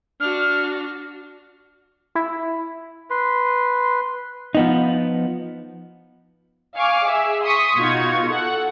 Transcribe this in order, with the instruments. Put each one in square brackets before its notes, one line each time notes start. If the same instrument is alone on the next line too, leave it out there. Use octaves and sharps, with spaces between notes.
[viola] D4 F#4 [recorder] F6
[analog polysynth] E4
[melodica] B4 C6
[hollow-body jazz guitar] F3 B3 D#4
[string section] F5 G#5 C#6 D6 F6
G#4 E5
C6 C#6 D#6 B6
B2 D#4 F4 F#4 C#6 G#6
A4 F#5